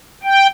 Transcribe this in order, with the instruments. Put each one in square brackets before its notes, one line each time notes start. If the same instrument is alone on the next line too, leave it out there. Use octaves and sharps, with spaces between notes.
[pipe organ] G5